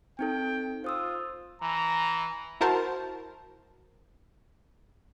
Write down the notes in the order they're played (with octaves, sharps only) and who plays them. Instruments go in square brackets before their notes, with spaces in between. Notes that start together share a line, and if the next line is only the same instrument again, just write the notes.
[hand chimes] C4 D#4 A4 [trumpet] G5
[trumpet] F4 [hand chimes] C5 D#6 E6
[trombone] E3 [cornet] A#5
[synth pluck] E4 F#4 A#4 C5 A5 A#5